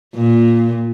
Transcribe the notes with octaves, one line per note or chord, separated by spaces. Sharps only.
A#2